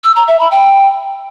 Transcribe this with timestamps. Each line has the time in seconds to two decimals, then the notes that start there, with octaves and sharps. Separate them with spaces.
0.04 E6
0.16 A#5
0.28 E5
0.40 B5
0.51 G5